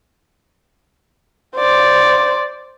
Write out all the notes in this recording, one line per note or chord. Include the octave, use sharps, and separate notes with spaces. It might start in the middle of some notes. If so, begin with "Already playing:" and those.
C5 D5